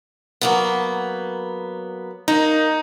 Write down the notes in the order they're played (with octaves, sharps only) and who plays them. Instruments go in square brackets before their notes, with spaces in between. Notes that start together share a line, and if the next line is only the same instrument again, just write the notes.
[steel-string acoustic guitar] F#3 A#3 B3
[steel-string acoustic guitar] A#3 [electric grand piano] D#4